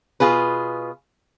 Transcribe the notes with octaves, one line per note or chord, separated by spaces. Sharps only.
B2 F4 G#4 B4